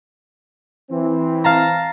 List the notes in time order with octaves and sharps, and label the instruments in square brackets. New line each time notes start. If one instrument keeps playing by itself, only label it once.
[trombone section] E3 C4
[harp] F5 A5 A#5